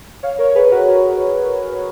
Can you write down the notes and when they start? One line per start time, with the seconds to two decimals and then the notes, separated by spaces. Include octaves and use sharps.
0.23 C#5 F5
0.39 A#4 C#5
0.55 G#4 B4
0.71 F#4 A#4
0.88 F#4 A#4